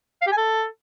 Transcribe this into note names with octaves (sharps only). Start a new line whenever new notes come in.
F5
G4
G#5
A4